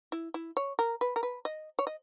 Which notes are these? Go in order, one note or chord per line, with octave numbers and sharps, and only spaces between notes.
E4
E4
C#5
A#4
B4
A#4
B4
D#5
C#5
D#5